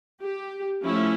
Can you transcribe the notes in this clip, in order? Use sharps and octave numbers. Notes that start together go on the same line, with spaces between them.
G4
F3 A3 C#4 E4